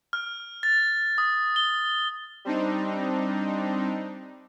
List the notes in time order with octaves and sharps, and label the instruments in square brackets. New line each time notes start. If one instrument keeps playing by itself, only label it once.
[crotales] F6
A6
D#6
G7
[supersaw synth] G3 C4 D4 D#4